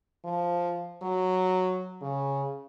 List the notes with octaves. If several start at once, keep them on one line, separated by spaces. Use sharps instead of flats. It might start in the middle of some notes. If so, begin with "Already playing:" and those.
F3
F#3
C#3